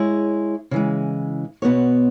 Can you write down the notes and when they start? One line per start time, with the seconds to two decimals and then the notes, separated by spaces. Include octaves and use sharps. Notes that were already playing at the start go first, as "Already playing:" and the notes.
Already playing: G#3 E4 G#4 C#5
0.71 C#3 E3 G#3
1.62 B2 B3 F#4 C#5